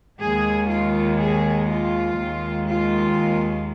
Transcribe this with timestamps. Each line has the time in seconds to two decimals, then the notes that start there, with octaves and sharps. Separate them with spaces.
0.20 D#2 D#3 G#3 G#4
0.70 F4
1.19 G#4
1.69 F4
2.18 D#2 D#3 G#3
2.69 F4